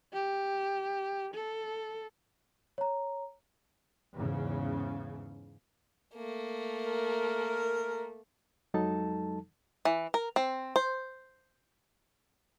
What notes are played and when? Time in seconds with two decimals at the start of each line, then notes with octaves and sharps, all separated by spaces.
0.13 G4
1.34 A4
2.78 C#5 A#5
4.15 E2 G#2 C#3
6.15 A3 A#3
6.86 A#4
8.74 F2 F#3 G#3 D#4 A4 A5
9.85 E3
10.14 A#4
10.36 C4
10.76 C5